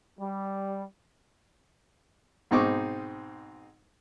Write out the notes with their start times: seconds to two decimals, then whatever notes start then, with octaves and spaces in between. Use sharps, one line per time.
0.19 G3
2.51 G#2 B2 C4 D#4 C#6 D6